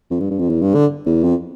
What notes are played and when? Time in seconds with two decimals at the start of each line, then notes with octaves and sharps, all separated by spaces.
0.11 F2
0.20 G2
0.31 G2
0.39 F2
0.49 E2
0.62 G2
0.75 D3
1.06 E2
1.24 F2